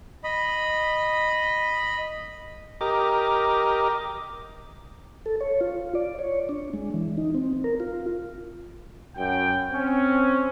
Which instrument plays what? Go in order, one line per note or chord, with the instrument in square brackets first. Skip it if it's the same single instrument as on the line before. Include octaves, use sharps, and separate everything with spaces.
[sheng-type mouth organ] D#5 B5
[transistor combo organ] G4 A#4 D#5 [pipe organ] D6
[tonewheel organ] A4
C#5
F4
D5
C#5
D4
G#3
E3
D#4
C4
A#4
F4
[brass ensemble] F#2 G5
C4 C#4